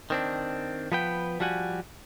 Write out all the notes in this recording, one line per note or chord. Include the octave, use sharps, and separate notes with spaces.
D#3 C4 D4
F3 B3 B4 G5
F3 G3 F#4 F#5 G#5